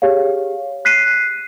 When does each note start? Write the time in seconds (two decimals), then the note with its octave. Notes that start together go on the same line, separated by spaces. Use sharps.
0.02 G4 G#4 C#5 F5
0.85 F#6 B6 C7 D#7